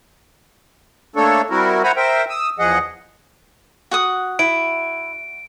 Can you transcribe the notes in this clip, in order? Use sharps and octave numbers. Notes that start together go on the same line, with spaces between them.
A3 A#3 D4 A4 C#5
G3 C4 E4 F#4 A#4
C5 E5 F#5 G#5 A#5 B5
A#4 C5 E5 G5
D#6 E6
E2 F3 G#4 D#5 F#5
F#4 F#5 D#6
E4 D7